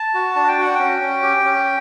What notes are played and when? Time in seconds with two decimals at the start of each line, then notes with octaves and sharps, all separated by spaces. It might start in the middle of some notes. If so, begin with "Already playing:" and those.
Already playing: A5
0.14 F#4
0.35 D4 A5
0.48 G5
0.58 F#4 F#5
0.75 C#4 G5
1.02 C#4
1.23 G4
1.45 C#4